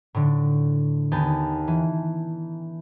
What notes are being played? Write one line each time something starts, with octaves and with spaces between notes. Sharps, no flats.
A2 D3
D#2 B3 G#5 A5 G6
E3